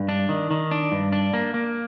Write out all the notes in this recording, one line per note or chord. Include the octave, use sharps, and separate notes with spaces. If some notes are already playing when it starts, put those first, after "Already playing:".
Already playing: G2
D4
D#3
D#3
D4
G2
D4
A#3
A#3